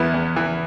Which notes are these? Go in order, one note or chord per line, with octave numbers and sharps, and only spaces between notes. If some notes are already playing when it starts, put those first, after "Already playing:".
Already playing: E2 B3 E4
E2
E3